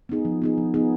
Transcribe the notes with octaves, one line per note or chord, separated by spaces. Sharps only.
B3 D#4 G#4
F3
B3 D#4 G#4
F3
B3 D#4 G#4